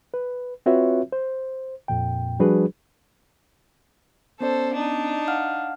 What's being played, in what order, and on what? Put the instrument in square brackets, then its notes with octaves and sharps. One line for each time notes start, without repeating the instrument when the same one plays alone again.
[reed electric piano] B4
C4 F4 F#4 B4 C#5 E5
C5
F2 A#2 G5
F3 G3 D4 F#4 G#4 B4
[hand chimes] B3 C#4 D5 [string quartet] A4 C5
[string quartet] D4 D#4
[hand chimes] F5 F#5 F6